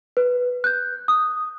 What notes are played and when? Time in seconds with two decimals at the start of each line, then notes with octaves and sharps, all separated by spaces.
0.17 B4
0.64 F#6 G6
1.08 D#6